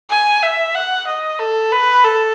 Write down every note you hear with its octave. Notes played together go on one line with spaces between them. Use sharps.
G#5
E5
F#5
D#5
A4
B4
A4